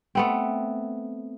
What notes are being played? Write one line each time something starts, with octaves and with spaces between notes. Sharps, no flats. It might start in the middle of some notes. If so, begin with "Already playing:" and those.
A3 B3 C4